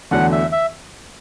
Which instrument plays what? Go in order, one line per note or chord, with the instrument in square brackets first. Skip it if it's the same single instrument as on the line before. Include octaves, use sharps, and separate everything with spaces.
[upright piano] E2 D3 F#3 A3 [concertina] F#5
[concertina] E5
E5